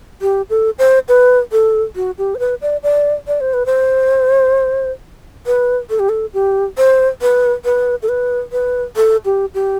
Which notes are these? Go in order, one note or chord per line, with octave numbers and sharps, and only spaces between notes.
G4
A4
C5
B4
A4
F#4
G4
C5
B4
D5
D5
D5
C5
B4
C5
B4
A4
G4
A4
G4
C5
B4
B4
A4
B4
B4
A4
G4
G4